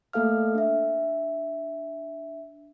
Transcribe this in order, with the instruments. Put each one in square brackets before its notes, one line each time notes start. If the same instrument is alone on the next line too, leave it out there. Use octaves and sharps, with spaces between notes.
[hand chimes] A3 A#3 A4 F5 F6
D4 E5